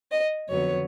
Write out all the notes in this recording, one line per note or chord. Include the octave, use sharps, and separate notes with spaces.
D#5
F2 D3 F#3 B3 C#5